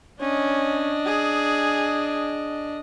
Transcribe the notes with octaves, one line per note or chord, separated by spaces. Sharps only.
C#4 D4 D#5
G#4